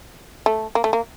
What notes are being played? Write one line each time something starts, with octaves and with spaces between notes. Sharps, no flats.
A3
A#3
A3
A#3